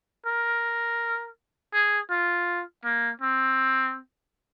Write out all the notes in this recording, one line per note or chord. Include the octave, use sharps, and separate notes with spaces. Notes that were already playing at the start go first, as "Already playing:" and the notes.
A#4
G#4
F4
A#3
C4